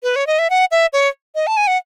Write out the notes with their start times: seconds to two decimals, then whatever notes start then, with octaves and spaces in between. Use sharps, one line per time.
0.03 B4
0.16 C#5
0.27 D#5
0.39 E5
0.50 F#5
0.71 E5
0.93 C#5
1.35 D#5
1.47 A5
1.57 G#5
1.67 F#5